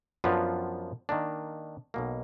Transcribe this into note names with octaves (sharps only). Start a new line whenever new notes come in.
F#2 F3 B3 D4 F4
D#3 A#3 D4
B1 B2 A#3